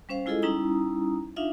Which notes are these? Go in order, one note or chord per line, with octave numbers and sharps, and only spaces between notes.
G3 C#4 C5 F5
G#3 E4 F4 G#4 A4 D#5
G3 C#4 D#4 E4 A#5 D#6
D4 D#4 F4 E5 F5